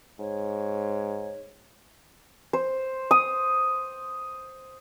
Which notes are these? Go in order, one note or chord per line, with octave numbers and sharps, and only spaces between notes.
G#2 C#5
C5
D#6